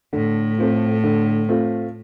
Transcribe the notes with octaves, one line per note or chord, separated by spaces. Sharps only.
A2 D3
A3 C4 F4
D3
A3 C4 F4